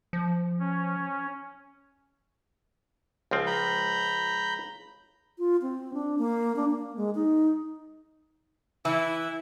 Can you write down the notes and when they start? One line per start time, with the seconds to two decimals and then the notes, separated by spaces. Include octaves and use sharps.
0.13 F3
0.60 C#4
3.31 C#2 F3 C4
3.46 A#5 B5 G6
5.38 F4
5.62 C4
5.94 D4
6.18 A#3
6.56 D4
6.71 A#3
6.97 G#3
7.15 D#4
8.85 E3 E4